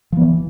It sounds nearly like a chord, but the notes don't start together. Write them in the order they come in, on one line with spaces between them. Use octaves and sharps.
F3 B3 E3